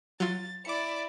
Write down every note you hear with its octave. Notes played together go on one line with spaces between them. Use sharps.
F#3 F4 A6
E4 D5 D6 C#7